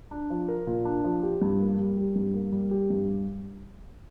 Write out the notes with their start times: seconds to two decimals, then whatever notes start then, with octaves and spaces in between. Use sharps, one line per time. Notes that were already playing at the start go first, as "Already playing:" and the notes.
0.11 D4
0.30 F3
0.48 A#4
0.67 A#2
0.85 D4
1.04 F3
1.23 G4
1.42 G2
1.60 A#3
1.79 G3
1.97 G4
2.16 G2
2.34 A#3
2.52 G3
2.71 G4
2.90 G2